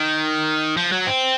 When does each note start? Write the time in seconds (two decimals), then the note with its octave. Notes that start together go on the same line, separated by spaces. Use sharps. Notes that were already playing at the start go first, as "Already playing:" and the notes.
Already playing: D#3
0.77 F3
0.92 F#3
1.07 C4